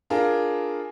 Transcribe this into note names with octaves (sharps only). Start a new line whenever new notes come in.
D4 F4 G#4 A#4